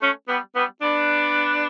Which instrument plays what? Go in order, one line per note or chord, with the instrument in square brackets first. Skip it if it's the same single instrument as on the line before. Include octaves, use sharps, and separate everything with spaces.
[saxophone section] A3 C#4
G3 B3
G3 B3
B3 D4